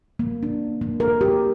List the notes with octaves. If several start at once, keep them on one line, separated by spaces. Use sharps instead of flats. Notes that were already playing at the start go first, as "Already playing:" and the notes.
A#3
D4
A#3
A#4
G4